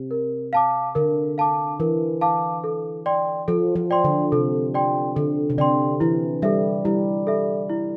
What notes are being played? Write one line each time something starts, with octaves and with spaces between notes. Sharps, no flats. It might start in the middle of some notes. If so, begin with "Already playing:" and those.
Already playing: C3
A#4
F5 A5 D6
D3 A#4
F5 A5 D6
E3 A#4
F5 A5 D6
A4
D5 G5 C6
F3 A4
F3
D5 G5 C6
D3
C3 A4
D5 G5 C6
D3 A4
C3
D3 D5 G5 C6
E3 E4
G3 A4 E5
G3 E4
A4 E5
E4